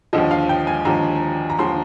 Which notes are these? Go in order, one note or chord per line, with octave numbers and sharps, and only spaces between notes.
D#2 D3 F3 D#5
F5
G5
G#5
D#2 D3 F3 A#5
A#5
D#2 D3 F3 C6